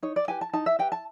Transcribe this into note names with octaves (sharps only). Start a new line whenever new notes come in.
D#4 C#5
D5
G4 B4 G#5
A5
D#4 A5
E5
G4 B4 G5
A5